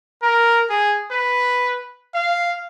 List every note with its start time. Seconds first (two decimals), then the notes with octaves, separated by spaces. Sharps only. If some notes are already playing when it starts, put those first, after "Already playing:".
0.23 A#4
0.70 G#4
1.11 B4
2.15 F5